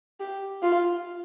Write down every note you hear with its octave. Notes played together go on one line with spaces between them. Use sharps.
G4
F4